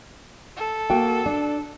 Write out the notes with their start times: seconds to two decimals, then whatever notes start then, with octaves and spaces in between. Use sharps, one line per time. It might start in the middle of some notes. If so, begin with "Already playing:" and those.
0.56 A4
0.90 A#3 F#4 G5
1.26 D4